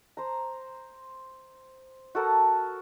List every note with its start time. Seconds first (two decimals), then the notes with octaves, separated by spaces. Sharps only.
0.17 C5 A#5
2.15 F#4 A4 A#4 A5